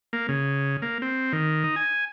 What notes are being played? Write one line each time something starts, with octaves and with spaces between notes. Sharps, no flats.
A#3
C#3
A#3
C4
D#3
D#4
G#5